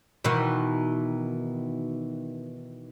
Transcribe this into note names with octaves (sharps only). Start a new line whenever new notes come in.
B2 D#3 E3